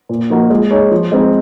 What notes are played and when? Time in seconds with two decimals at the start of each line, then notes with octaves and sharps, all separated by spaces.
0.09 A#2
0.30 F3 A#3 D#4 F#4
0.50 G#3
0.71 D#4 G#4 C#5
0.91 F3
1.12 G#3 C4 D#4